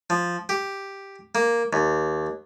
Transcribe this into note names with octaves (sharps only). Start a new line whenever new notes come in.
F3
G4
A#3
D#2